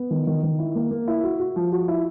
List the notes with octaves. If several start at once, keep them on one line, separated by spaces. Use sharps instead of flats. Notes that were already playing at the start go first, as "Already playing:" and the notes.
Already playing: B3
D#3
D#3
D#3
E4
A#3
A#3
E4
F#4
F#4
F3
F#4
E4